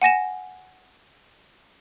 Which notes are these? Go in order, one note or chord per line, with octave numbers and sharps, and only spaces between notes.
F#5 G#5 A#6 E7